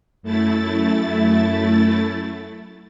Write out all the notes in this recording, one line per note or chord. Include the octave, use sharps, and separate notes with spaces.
F#2 A3 E4 A6